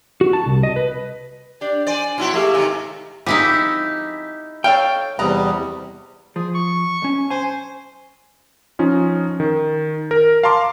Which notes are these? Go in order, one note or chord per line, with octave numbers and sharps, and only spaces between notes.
F#4
A5
C2
D#5
B4
D4 G4 D5
C5 D5 G#5
A#2 F#3 E4 F#4 C6
A3 G4 G#4 E5 F5
G#2 C3 D#3 D#5 G#5
F3 G#3 C4 D#4 E4 G4
A4 C#5 F5 G5
E2 C3 G3 B4 D#5 A#5
F3 G#4
C#6
B1 C#4
C5 G#5
F3 C#4 D#4 F4
D#3
A#4
F5 A5 A#5 C6 D6